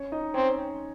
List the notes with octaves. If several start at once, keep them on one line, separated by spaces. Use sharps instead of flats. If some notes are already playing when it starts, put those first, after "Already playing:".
Already playing: C#4 C#5
D#4 D#5
C4 C#4 C#5